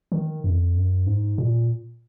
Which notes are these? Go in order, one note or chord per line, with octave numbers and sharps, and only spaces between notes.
D#3
F2
F#2
G#2
A#2